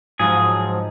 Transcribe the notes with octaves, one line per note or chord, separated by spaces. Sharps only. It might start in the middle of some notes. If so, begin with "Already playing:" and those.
G#2 F3 F#3 G#4